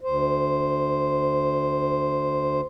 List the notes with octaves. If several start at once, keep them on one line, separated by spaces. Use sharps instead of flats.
D2 C5